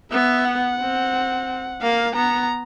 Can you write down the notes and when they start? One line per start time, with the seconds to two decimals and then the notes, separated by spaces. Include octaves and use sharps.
0.11 B3 E5
0.45 F#5
0.80 C4
1.82 A#3 F5
2.15 B3 A#5